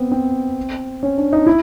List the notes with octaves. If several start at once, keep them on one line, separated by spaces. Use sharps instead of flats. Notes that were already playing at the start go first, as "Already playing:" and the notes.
Already playing: B3 C4
C4
C#4
D4
D#4
E4